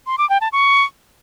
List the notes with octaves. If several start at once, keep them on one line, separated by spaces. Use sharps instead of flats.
C6
D6
G5
A5
C#6